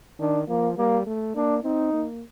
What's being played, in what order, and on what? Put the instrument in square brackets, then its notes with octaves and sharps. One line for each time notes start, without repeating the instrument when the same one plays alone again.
[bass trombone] D#3 [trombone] D4
[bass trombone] F3 [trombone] A#3
[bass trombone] G3 [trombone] A#3
[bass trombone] A3
[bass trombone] A#3 [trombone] D4
[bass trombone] C4 [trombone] D#4
[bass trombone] A#3